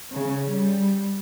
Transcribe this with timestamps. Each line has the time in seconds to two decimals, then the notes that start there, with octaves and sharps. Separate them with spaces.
0.13 C#3
0.50 G3